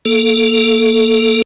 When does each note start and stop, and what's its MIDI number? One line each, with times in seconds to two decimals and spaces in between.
0.05 1.42 58
0.05 1.42 69